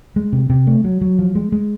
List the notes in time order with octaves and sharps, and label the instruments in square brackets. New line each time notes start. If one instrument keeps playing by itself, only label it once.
[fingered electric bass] G#3
C3
C3
A3
F#3
F#3
F3
G#3
G#3